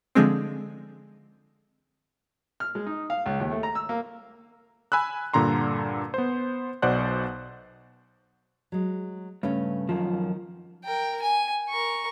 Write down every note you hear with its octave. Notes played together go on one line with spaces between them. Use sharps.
D3 F3 G#3 C4
F6
G#3
D#4
F5
C#2
D#2
A3
A#5
E6
A#3
G#5 B5 E6 F#6
G2 A#2 D3 A#5 C6
B3 C5
B1 B2 C5 D5 F#5 F#6
F#3 G#3
G2 C#3 A3 C#4
F#2 D#3 F3
A#4 G5
G#5
A#4 C#6